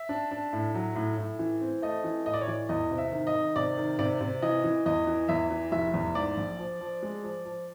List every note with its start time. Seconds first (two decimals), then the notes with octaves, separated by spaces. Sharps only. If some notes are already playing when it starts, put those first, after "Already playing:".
Already playing: E5
0.09 D4
0.31 D4
0.53 A2
0.74 F#3
0.96 A2
1.18 A2
1.39 E3
1.61 C4
1.82 A3 D#5
2.04 E3
2.26 A2 D#5
2.34 D5
2.41 C#5
2.48 E3 D5
2.69 E2 D#5
2.91 C3
2.98 E5
3.12 D#3
3.27 D#5
3.34 D#3
3.56 C3 D5
3.77 D#3
3.99 C3 D5
4.21 C3
4.42 E3 D#5
4.64 E3
4.86 E2 D#5
5.07 E3
5.29 E2 E5
5.50 E3
5.72 F1 E5
5.94 E2
6.15 G#2 D5
6.37 A#1
6.59 F3
6.81 F3
7.03 G#3
7.23 F3
7.45 F3